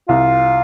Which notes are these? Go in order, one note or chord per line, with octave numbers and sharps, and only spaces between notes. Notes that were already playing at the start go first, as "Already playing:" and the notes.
C2 F4